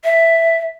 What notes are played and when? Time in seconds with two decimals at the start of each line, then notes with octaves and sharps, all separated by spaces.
0.04 E5